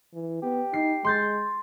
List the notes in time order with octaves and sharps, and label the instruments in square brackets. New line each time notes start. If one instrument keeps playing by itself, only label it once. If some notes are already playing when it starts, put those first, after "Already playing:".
[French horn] E3
[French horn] B3 [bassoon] G4
[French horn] D#4 [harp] C7
[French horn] G#3 [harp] C6 G6 A6